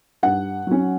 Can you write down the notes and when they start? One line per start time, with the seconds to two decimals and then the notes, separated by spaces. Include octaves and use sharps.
0.23 G2 F#5
0.67 F#3 C#4